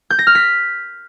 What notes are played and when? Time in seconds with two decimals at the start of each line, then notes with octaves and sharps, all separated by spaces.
0.10 G6
0.19 A#6
0.27 F6
0.35 B6